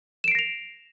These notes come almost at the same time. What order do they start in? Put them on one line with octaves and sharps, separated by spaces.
E7 D7 C7 A#6 F7